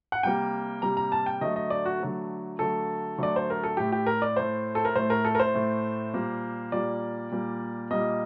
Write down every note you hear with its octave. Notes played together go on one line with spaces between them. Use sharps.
F#5
C3 G3 A#3 G5
C3 G3 A#3 A#5
A#5
A5
G5
D3 F#3 A3 D#5
D#5
D5
F#4
D3 F#3 A3
D3 F#3 A3 A4
D3 F#3 A3 D5
C5
A#4
A4
A2 A3 G4
G4
A#4
D5
A2 A3 C5
A4
A#4
A2 A3 C5
A#4
A4
A#4
C5
A2 A3
A#2 G3 A#3
A#2 G3 A#3 D5
A#2 G3 A#3
A#2 G3 A#3 D#5